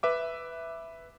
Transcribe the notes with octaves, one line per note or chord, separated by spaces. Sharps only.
B4 E5 D6